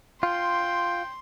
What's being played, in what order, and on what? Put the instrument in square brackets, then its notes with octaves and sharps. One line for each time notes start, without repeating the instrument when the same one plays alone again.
[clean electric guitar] F4 [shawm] G5 [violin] C6